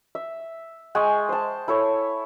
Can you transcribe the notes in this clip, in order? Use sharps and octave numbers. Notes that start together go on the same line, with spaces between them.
E5
G#3 G5 G#5 C#6
C5 A5
E4 A4 C#5